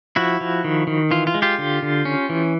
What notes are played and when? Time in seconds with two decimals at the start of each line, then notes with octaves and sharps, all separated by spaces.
0.16 F3 E4 F#4
0.41 F3
0.64 D#3
0.87 D#3
1.11 E3 F4
1.27 F4
1.34 G#3
1.42 F4 G4
1.58 D3
1.82 D3
2.05 C#4
2.29 E3